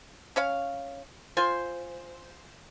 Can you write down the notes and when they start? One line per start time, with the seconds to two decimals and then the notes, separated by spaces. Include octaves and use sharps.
0.36 C#4 C#5 F5
1.37 F4 C5 G#5